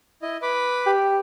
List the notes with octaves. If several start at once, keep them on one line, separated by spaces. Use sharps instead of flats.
E4 D#5
B4 B5 D6
G4